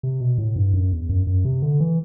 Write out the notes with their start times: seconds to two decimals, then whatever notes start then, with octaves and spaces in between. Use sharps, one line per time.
0.03 C3
0.20 B2
0.38 A2
0.56 G2
0.74 F#2
0.92 E2
1.09 F#2
1.27 F#2
1.45 C3
1.62 D3
1.80 E3